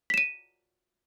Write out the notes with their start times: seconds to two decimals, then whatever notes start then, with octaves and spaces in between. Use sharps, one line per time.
0.10 B6
0.14 E7
0.18 D#7